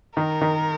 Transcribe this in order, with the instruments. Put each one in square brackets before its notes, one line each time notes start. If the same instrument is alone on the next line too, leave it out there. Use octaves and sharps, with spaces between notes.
[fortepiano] D#3 [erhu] A#4
[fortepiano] D#3